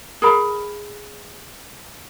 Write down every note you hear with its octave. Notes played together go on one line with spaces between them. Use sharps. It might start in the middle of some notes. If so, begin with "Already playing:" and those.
G#4 A#4 B5